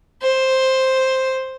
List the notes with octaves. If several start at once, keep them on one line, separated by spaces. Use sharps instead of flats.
C5